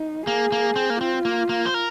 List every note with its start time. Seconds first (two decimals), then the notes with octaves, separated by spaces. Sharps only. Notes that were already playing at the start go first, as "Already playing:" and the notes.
Already playing: D#4
0.27 A#3 G#4
0.52 A#3
0.76 C4
0.90 A#3
1.00 C4 F4
1.25 A#3
1.49 A#3
1.66 C5
1.74 A#4